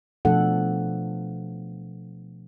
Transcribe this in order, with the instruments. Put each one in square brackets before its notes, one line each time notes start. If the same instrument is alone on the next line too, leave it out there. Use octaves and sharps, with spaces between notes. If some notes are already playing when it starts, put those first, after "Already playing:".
[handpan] B2 F3 A3 D4 A4 F#5